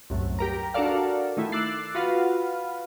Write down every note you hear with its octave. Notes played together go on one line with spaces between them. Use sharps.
C2 F#2 A2
G4 A#4 A#5
D4 F#4 A4 A#4 D5 F5
D#3 A3 E4
D6 E6 F#6 A6 C7
F4 F#4 B4 F5